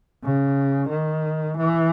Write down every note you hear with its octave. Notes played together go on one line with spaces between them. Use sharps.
C#3
D#3
E3